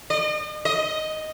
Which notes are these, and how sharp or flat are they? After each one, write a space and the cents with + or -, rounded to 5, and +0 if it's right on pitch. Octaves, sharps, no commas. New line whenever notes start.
D#5 -45
D#5 +0